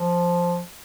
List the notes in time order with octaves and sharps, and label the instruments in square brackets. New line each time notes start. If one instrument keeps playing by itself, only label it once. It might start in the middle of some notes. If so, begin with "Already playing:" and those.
Already playing: [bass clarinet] F3